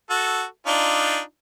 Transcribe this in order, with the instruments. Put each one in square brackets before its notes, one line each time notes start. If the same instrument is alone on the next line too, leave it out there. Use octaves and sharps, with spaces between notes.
[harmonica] F#4 A4
D4 D#4 F4